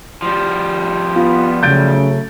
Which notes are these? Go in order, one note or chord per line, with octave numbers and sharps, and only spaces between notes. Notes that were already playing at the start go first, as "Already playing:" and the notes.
F3 G3
B3 F4
C#3 F#3 A3 G6 A6 D7